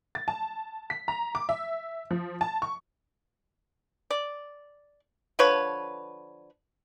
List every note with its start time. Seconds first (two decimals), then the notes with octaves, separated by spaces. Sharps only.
0.15 A6
0.28 A5
0.90 B6
1.08 A#5
1.35 D6
1.49 E5
2.11 F3
2.41 A5
2.62 C#6
4.10 D5
5.39 D3 F3 B4 C#5